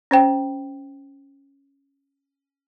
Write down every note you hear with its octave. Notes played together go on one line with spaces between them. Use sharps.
C#4 C5 G5